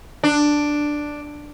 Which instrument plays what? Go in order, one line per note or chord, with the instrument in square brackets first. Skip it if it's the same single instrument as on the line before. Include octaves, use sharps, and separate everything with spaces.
[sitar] D4